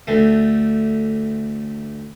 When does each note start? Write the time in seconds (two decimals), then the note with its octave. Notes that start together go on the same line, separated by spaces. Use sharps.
0.07 D2 A3